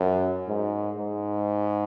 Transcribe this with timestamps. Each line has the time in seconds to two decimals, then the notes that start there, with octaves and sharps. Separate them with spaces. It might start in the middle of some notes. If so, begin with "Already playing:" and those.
Already playing: F#2
0.48 G#2
0.98 G#2